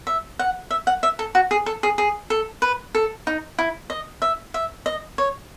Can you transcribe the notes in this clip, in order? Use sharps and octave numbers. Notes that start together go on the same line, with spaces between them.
E5
F#5
E5
F#5
E5
A4
F#4
G#4
A4
G#4
G#4
A4
B4
A4
D#4
E4
D#5
E5
E5
D#5
C#5